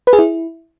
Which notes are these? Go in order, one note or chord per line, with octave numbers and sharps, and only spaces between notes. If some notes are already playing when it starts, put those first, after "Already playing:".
B4
G#4
E4